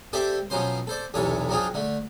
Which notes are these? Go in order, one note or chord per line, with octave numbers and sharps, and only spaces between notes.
C4 G4 A4 C5 D5 E5
B2 F3 F#3 C#4 C5 C6
A4 C5 D5
B1 E2 C3 E3 A4 C#5
F3 F#3 C4 D4 F4 G#4
D3 A3